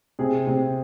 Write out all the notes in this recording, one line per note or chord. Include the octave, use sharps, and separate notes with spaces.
C3 G#4
C3